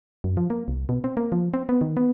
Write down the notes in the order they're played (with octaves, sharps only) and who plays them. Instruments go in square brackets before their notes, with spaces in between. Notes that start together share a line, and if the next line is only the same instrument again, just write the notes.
[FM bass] F#2
F3
A#3
C2
B2
C4
A#3
F3
C4
B3
D#3
B3